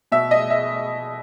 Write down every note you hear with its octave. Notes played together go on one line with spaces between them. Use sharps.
B2 E5
D#5
E5